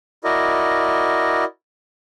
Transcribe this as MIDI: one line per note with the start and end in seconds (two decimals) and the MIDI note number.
0.24 1.44 64
0.24 1.44 66
0.24 1.44 70
0.24 1.44 74
0.24 1.44 75